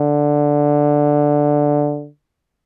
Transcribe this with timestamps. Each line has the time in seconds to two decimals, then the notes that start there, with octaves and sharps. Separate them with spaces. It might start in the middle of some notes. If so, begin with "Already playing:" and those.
Already playing: D3